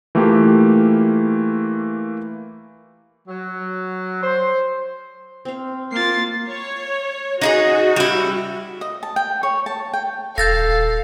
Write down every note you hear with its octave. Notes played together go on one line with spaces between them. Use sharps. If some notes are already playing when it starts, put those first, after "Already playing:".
E3 A3 A#3 F4 G4
F#3
C5
C4 F5
A#3 F4 A6 C7
C#5
D#4 E4 F#4 G#4
G3 E4
D#5
A5
G5
C#5
A5
G5
D#1 A4 F5 G6 A6 A#6